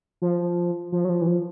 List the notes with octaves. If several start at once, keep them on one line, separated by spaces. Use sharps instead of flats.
F3
F3
F#3
F3
E3
F3